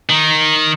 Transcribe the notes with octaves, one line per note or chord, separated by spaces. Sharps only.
D#3